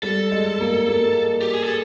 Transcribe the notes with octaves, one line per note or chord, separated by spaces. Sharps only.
G3 A4
G#3
A#3
A#3
G4
G#4
A4